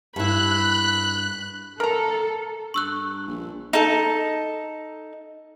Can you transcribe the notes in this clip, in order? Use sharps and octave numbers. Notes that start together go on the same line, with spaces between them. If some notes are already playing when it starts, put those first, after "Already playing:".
G2 E4 B5 F#6
A4 A#4 A#5
G2 C#6 E6 F#6
A#1
D#4 A4